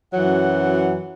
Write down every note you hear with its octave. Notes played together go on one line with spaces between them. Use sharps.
F#2 E3 F#3 F#5